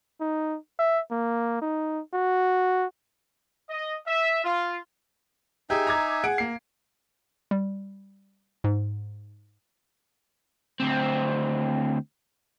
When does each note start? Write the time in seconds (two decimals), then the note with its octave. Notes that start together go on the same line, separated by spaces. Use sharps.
0.20 D#4
0.79 E5
1.11 A#3
1.62 D#4
2.13 F#4
3.70 D#5
4.07 E5
4.44 F4
5.70 D#4 G4 G#4 E5 G#5
5.87 A#5 D6 G#6
6.24 G#4 F#5 D7
6.38 A#3 C7
7.51 G3
8.64 G#2
10.80 D2 C4